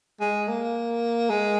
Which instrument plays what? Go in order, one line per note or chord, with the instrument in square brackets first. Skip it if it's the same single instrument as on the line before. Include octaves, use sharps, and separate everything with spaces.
[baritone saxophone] G#3
A#3
G#3